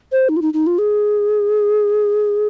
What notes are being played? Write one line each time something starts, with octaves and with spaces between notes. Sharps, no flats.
C5
D#4
F4
D#4
D#4
F4
G#4